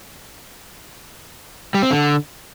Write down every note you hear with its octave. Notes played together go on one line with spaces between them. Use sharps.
G3
C4
D3